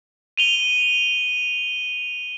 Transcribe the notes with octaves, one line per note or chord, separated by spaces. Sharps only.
D#7 F7 G7